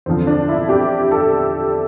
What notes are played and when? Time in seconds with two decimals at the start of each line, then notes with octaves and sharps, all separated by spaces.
0.06 E2 D3 F3 C4
0.27 D4
0.49 E4
0.69 G4
1.11 A4